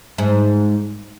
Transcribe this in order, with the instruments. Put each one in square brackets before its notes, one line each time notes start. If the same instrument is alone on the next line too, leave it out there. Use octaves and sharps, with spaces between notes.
[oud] G#2